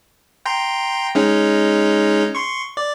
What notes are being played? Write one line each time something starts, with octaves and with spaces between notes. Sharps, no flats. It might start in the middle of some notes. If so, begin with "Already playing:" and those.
G5 A#5 C6
G#3 C#4 D#4
C6 C#6
D5